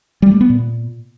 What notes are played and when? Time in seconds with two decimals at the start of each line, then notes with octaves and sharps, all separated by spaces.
0.22 G3
0.32 A3
0.41 B3
0.50 A#2